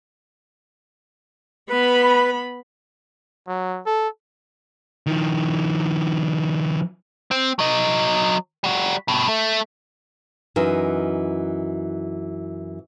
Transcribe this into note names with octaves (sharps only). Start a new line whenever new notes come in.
B3 B4 B5
F#3
A4
D#3 F3
C4
F#3 D#5
G3 F#4
G2 B2
A3
F#2 E3 D#4